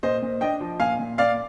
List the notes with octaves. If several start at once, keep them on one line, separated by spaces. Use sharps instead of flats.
A#2 C5 D#5
A#2
D4 D#5 G5
F3
A#2 F5 G#5
A#2
A#2 D5 F5